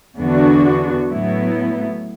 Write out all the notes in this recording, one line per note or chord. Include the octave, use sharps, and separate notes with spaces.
E2 D3 B3 D4 F#4
A2 F#3 B3 E4